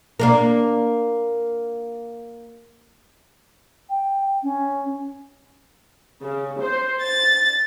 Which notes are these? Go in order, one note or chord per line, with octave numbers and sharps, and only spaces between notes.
A#3 D4 A#4
G5
C#4
C#3
C5
A6